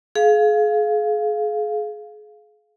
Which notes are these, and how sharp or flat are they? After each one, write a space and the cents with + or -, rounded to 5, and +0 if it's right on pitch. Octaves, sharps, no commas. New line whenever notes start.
G#4 +35 F5 +0